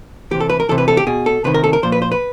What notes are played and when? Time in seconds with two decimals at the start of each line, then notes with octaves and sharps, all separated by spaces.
0.31 C3 E3 G4
0.40 A4
0.50 B4
0.60 A#4
0.69 C3 E3 A4
0.78 B4
0.88 A4
0.97 G4
1.07 B2 G#4
1.26 A4
1.44 C3 D#3 B4
1.54 A#4
1.64 A4
1.73 A#4
1.83 A#2 F3 C5
1.92 B4
2.02 C5
2.12 B4